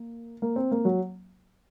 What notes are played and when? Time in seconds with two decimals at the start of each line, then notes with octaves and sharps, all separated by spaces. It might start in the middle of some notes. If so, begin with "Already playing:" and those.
Already playing: A#3
0.42 A#3
0.56 C4
0.71 A#3
0.85 F#3